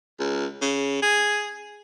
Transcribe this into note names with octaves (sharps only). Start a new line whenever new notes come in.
C#2
C#3
G#4